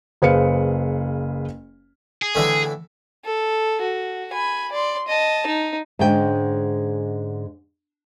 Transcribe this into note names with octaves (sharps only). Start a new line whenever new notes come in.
F#1 G#4 B4 C5 F5 C#7
G#4
A2 D3 E3
A4
F#4
G#5 B5
D5 C6
D#5 A5
D#4
G#2 D3 G#3 C#4 G5